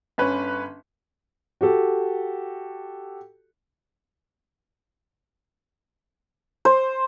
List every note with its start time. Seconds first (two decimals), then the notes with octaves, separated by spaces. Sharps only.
0.18 G1 C#4 B4
1.61 F#4 G4 A4
6.65 C5